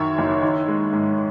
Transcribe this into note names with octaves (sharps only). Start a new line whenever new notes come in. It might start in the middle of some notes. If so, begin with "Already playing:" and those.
Already playing: F#2 D#3 C#5 E5
F#1
D#3
G#3
G#2